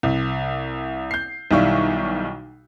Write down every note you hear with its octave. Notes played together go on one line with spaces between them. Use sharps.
C2
G6 C7
B1 D#3 G3 E4 F5 C#6